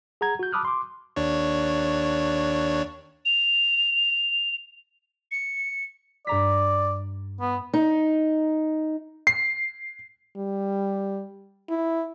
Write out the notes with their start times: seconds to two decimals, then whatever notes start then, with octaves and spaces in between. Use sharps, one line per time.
0.21 G#4 F#5 A#5 G#6
0.39 F#4 G6
0.52 A5 B5 D6 D#6 F6 F#6
0.65 C6 D6
1.16 D#2 D4 C#5
3.25 F7
5.32 C#7
6.27 G2 D5 A#5 B6
7.41 B3
7.74 D#4
9.27 C7
10.37 G3
11.70 E4